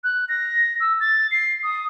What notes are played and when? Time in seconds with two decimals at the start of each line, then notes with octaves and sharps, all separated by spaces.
0.04 F#6
0.29 A#6
0.80 E6
1.00 A6
1.31 C7
1.63 D#6